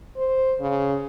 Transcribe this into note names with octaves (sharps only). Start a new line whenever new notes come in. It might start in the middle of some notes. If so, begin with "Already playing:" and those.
C5
C#3